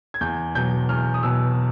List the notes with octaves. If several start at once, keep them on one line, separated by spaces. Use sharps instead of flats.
G#6
E2 G6
B2 F#3 G6
E2 F6
D#6
B2 F#3 E6